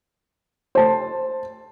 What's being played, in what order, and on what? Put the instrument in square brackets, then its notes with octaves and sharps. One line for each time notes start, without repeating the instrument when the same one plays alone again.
[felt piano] C5 A5